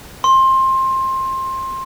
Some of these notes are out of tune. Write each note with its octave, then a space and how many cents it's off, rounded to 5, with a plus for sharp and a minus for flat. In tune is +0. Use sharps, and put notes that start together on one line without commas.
C6 +20